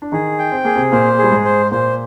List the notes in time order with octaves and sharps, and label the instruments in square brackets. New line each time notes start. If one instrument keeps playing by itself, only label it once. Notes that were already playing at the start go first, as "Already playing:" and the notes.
[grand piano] D4
[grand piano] D#3 D#4 [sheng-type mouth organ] G#4
[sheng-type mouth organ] G5
[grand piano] C4
[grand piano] A#3 [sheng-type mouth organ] G#4
[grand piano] C3 C4
[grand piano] A#2 A#3 [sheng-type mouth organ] C5
[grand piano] G3 [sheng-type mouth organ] G#4
[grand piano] G#2 G#3
[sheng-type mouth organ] C5
[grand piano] A#2 A#3 [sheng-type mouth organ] C5